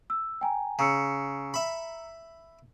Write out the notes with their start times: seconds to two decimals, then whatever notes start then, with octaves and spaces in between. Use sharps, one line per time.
0.10 E6
0.41 G5 G#5 A#5
0.79 C#3 A#5 E6 C#7
1.54 E5 B5